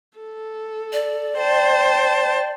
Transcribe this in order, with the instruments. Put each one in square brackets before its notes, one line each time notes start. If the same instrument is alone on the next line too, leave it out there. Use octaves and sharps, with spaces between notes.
[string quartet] A4
[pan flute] D5
[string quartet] C5 G5 A5